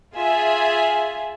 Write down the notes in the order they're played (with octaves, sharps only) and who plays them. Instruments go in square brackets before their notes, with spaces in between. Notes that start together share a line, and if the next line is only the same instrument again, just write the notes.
[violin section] F4 G#4 E5 G#5